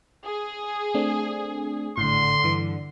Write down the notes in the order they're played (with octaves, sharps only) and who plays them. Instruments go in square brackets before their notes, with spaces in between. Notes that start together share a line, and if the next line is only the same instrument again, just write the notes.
[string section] G#4
[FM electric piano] A3 C4 D4
[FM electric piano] G#1 A2 [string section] D3 [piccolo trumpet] C6
[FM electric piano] G2 E3